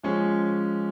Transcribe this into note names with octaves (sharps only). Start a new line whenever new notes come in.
F3 G#3 C#4